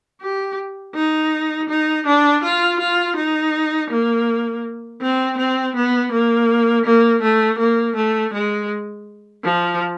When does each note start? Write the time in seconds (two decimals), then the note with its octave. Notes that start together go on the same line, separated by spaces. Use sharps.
0.21 G4
0.95 D#4
1.70 D#4
2.07 D4
2.43 F4
2.80 F4
3.16 D#4
3.90 A#3
5.01 C4
5.38 C4
5.76 B3
6.12 A#3
6.85 A#3
7.22 A3
7.59 A#3
7.96 A3
8.34 G#3
9.44 F3